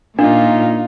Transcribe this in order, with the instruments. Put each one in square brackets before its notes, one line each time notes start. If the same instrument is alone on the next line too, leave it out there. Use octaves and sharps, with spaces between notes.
[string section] A#2 [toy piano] D4 [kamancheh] D#4 F4